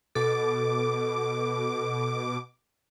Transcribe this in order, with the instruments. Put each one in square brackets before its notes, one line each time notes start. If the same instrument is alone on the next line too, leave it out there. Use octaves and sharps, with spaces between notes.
[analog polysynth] B2 D6 [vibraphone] A4